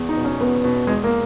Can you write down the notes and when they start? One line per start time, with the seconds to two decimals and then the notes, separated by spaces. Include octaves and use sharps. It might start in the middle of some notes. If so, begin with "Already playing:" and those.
Already playing: E2
0.09 D#4
0.17 B2
0.25 C#4
0.41 E2 B3
0.64 B2
0.87 E2 G#3
1.04 A#3